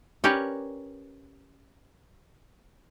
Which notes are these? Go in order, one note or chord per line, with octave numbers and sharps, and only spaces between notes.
C#4 G4 A#4 B4 C#5 D5